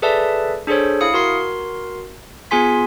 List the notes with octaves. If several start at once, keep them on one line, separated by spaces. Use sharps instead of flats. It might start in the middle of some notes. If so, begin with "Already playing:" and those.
G#4 A4 B4 D5 E5 A5
D4 G#4 A4 C5 C#5
E4 F5 D#6 C#7
F#4 A#4 C6 C7
B3 F4 G#4 G#5 C6 B6